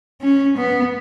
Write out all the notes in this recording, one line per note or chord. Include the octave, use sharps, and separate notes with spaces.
C#4
B3